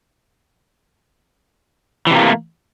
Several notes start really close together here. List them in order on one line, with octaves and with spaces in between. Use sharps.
E3 C3 A#3 A3